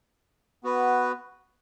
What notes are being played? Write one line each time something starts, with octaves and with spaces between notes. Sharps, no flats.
B3 F#4 B4